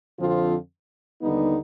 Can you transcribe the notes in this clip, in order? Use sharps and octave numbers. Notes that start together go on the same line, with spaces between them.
F2 D3 F3 C4 F4
D#2 D3 G3 B3 D#4